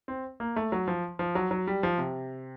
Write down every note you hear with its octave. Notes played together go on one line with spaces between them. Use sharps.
C4
A#3
A3
F#3
F3
F3
F#3
F#3
G3
F3
C3